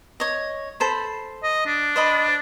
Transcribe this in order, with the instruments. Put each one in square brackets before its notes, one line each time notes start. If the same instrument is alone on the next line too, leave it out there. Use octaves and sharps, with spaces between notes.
[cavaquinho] C#5 D#5
A4 C5 B5
[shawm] D#5
D4
[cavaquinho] C5 D#5 B5